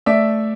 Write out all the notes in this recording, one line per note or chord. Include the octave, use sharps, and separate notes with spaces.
A3 D5 E5